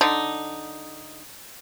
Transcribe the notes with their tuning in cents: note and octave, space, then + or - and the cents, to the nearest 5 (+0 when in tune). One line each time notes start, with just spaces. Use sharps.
D3 +0 D#4 +0